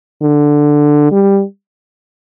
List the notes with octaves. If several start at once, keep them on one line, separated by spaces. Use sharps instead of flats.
D3
G3